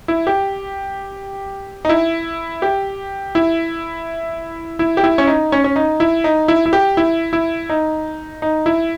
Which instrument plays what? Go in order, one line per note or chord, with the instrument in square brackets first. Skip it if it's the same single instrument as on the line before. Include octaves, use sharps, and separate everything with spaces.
[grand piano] E4
G4
D#4
E4
G4
E4
E4
G4
E4
C#4
D#4
C#4
C#4
D#4
E4
D#4
E4
E4
G4
E4
E4
D#4
D#4
E4